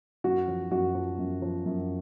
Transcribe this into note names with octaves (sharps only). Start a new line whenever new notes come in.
F#2 F#4
F3
F#2 F#4
F3
F#2
F3
F#2